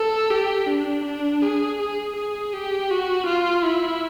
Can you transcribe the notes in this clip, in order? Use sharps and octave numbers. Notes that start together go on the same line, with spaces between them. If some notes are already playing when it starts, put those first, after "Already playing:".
Already playing: A4
G4
D4
D4
G#4
G#4
G#4
G4
F#4
F4
E4